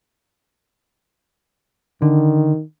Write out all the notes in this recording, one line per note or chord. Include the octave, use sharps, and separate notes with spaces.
D3 D#3